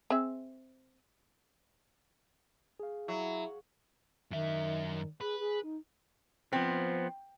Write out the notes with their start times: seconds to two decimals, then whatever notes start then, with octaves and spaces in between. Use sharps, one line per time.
0.10 C4 G#4 E5
2.80 G#4 F5
3.08 F#3 E4
4.31 F#2 D#3 E5
5.21 G#4 B4
5.39 G#4
5.63 D#4
6.53 F3 B3 C4